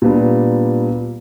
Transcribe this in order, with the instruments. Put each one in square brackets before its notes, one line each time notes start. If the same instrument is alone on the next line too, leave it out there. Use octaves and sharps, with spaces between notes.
[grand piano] A#2 G3 B3 D4